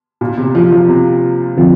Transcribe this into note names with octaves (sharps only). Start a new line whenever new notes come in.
A#2
C3
F3
F3
C3
D3 F3 C4 F4